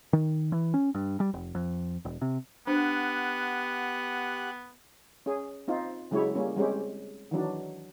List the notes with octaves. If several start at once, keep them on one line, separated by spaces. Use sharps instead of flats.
D#3
E3
C#4
G2
G3
F1
F2
E1
C3
B3 D4 G4 C5 F#5 F#6
C#4 G#4
C4 D#4 F4
C#3 F#3 G#3 E4 G4 C#5
G3 A#3 C#4
G3 G#3 C4 C#4 G4
D#3 E3 F#3 D4